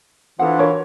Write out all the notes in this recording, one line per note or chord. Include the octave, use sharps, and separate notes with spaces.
E3 F3 D4 E4 A4 F#5
F#4 A#4 C#5